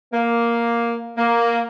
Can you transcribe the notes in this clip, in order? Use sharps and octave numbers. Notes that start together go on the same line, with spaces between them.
A#3
A#3